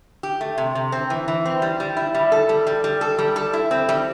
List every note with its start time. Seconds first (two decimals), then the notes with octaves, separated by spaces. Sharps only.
0.23 G4
0.41 A3
0.58 C3
0.75 C3
0.92 C4
1.10 E3
1.28 E3
1.46 C4
1.62 G3
1.80 G3
1.97 E4
2.14 G3
2.32 A4
2.49 G3
2.67 G3
2.84 G3
3.01 A4
3.19 G3
3.36 A4
3.53 E4
3.71 C4
3.89 G3